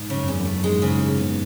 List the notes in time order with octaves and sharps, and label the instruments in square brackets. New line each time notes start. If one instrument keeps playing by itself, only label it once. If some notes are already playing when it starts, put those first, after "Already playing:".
Already playing: [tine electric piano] G#2
[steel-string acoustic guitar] C#3
[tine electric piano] F#2
[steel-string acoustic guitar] E2
[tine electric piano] F#2
[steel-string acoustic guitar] A3
[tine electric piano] G#2 [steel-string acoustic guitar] G#3
[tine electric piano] A2
[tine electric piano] G#2 [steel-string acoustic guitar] C#3
[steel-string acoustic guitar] D#2
B3